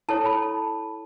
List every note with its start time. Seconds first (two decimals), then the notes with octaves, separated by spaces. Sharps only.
0.09 E4 A4 C#5 A5
0.26 B5
0.42 A5